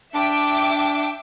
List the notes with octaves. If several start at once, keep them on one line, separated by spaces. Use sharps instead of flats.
D4 E5 G5 D6